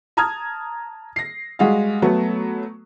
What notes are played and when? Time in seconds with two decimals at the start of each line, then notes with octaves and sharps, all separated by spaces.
0.17 A5 A#5 D#6 F6 G#6
1.16 A#6 C7
1.59 G3 G#3 F#4 G#4 F5
2.02 F#3 A3 B3